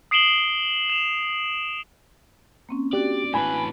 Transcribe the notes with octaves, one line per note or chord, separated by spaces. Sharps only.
D#6 C7 D7 E7 F#7 G7
E7 F7
A#3 C4 C#4
D4 F#4 G4 D5
A2 B4 G#5 B5